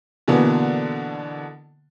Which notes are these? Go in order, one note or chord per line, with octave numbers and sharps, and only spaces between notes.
B2 D3 E3 A#3 B3